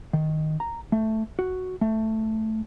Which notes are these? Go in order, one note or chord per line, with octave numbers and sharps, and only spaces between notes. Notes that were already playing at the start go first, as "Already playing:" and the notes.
D#3
A#5
A3
F#4
A3